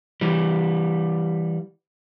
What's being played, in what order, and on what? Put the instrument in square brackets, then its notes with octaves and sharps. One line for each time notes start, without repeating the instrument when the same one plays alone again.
[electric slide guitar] E3 G3